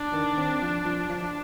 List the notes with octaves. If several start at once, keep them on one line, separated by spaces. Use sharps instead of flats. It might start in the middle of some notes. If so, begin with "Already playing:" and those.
Already playing: D4
D#3
C4
F3
F3
F3 D4